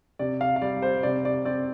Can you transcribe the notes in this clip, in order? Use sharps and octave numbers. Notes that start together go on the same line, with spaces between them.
C3 D5
F5
F5
G3 D5
C5
C3 D5
D5
C4 D5